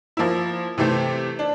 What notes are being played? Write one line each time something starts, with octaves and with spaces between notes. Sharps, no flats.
F3 A#3 E4
C3 E3 A3 C4
D4